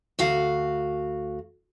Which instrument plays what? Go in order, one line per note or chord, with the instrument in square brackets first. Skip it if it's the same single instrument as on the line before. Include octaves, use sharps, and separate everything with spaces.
[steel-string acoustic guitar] D2 F#4 F5